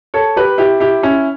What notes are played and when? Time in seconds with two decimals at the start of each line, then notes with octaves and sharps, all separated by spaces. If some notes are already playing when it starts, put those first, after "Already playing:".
0.14 A4 C#5
0.36 G4 B4
0.58 E4 G4
0.80 E4 G4
1.03 C#4 E4